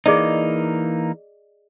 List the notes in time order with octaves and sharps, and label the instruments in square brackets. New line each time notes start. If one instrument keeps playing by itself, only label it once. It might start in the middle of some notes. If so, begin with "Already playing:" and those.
[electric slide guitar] E3 A#3 D#4 [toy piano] G#4 D5 D#5